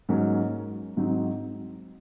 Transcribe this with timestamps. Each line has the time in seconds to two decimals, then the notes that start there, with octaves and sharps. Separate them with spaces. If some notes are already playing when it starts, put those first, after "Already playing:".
0.09 G#2 F#3 A#3 C#4
0.97 G#2 F#3 C4 D#4